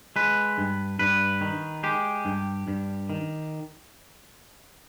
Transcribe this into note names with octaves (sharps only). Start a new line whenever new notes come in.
G#3 B4
G2
G2 B4
D#3
G#3 G4
G2
G2
D#3